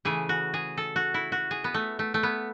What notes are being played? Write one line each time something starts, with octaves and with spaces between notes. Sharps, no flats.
C#3 E3 A3 G#4
F#4
G#4
A4
F#4
E4
F#4
G#4
B3
A3
A3
A3
B3